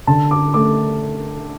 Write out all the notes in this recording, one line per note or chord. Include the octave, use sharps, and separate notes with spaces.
D3 A5
D6
A3 D6